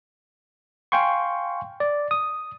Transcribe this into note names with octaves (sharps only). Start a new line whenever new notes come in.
F5 G5 G#5 C6 C#6
D5
D#6